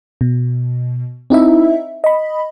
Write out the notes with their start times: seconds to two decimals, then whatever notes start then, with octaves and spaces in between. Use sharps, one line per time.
0.21 B2
1.30 C4 D#4 E4 E5
2.04 D#5 B5